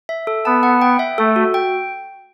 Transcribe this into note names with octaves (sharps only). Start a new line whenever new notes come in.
E5
A4
B3 A5
F#5
G5
E5
A3 A4
F#4
G5